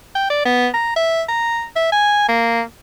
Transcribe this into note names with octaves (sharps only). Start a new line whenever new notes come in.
G5
D5
B3
A#5
E5
A#5
E5
G#5
A#3